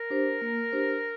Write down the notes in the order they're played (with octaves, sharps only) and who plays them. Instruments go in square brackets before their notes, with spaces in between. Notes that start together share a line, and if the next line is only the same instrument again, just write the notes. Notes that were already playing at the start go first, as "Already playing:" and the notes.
Already playing: [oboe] A#4
[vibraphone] D4 G4 C5
A#3
D4 G4 C5